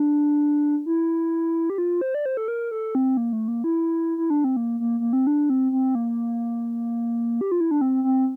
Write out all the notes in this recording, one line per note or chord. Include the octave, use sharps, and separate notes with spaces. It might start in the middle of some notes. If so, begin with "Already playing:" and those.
Already playing: D4
E4
G4
F4
C5
D5
C5
A4
A#4
A4
C4
A#3
A3
A#3
E4
E4
D4
C4
A#3
A#3
A#3
C4
D4
C4
C4
A#3
G4
F4
E4
D4
C4
C4